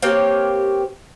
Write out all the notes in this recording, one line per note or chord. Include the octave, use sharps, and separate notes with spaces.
A#3 C4 G4 C#5